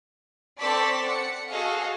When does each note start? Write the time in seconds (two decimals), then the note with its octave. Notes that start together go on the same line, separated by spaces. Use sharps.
0.59 C4 A4 D5 A5 C#6 B6
1.05 F#5 C#7
1.50 F#4 G#4 A4 D#5 F5